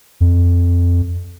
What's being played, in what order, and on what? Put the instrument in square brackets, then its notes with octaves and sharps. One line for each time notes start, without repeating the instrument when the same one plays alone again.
[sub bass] F2